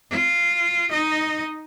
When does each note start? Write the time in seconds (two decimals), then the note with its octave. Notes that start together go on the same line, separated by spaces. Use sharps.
0.11 F4
0.90 D#4 D#5